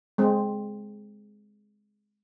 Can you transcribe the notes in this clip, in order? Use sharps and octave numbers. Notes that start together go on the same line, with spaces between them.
G#3 C4